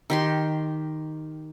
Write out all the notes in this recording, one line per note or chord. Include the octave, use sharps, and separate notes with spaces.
D#3 G4 C6